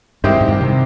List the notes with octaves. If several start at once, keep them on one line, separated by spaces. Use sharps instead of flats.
G2 D#3 G#3 C4 E4 G4
G#2
G2
C3